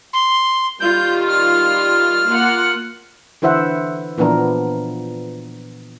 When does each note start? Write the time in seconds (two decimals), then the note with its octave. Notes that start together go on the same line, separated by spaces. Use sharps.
0.13 C6
0.80 D#3 G3 F4 G6
1.28 F6
2.26 A#3 F4 F#5
3.42 D3 E3 E4 C5 E5 F#5
4.18 A#2 E3 F3 B3 D4 A#4